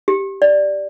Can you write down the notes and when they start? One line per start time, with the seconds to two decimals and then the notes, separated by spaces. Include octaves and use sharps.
0.08 G4
0.42 D5